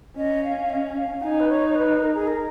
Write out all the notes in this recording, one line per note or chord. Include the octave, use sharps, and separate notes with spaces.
C#4 D#5
F5
F5
D#5
D#5
F5
D#4 G#5
B4
C#5
C#5
B4
A#4
G#4
A#4